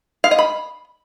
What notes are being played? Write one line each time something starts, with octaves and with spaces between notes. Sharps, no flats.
F5
D#5
B5